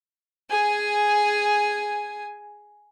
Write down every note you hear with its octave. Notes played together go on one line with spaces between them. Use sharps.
G#4 G#5